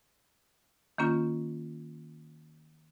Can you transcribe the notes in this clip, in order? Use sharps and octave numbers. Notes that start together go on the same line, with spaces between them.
D#3 A#3 C#4 F4